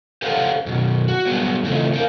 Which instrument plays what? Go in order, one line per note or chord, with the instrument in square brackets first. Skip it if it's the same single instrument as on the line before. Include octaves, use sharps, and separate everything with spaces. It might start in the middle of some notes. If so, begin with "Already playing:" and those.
[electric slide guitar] G4 A4 B4 C5 F5 F#5
F#2 B2
F#4
F#3 G3 B3 F#4 G#4
C#3 E3 A3 C4 D#4 F4
D#4 A#4 F5